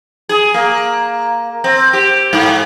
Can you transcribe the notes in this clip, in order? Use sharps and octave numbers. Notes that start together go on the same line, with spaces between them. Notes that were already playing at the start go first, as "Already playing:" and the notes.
G#4
A#3
C4
G4
G#2